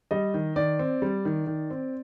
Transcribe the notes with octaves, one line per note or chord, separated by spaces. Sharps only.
G3 D#5
D#3
D#3 D5
C4
G3
D#3
D#3
C4